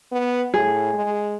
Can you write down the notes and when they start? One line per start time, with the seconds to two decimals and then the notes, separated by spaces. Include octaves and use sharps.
0.12 B3
0.54 A2 G#4
0.93 G#3